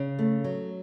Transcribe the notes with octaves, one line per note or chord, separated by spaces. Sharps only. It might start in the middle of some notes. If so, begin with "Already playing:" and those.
Already playing: C#3
A3
F#3